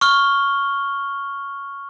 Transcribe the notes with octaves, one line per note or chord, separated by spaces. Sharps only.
C#6 F6 G7